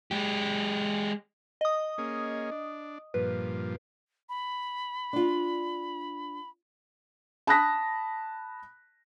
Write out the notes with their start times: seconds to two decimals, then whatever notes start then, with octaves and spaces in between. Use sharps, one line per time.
0.11 G#3 G4
1.61 D#5 D#6
1.98 A#3 C#4 G#4
2.51 D4
3.14 G2 A#2 F3 B4
4.29 B5
5.13 D4 F4
7.47 A5 B5 D#6 F#6 A#6 B6